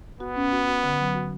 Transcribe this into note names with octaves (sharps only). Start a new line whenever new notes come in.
B3 F#4
C#4
F#4
F#4
D3
F#3
F#4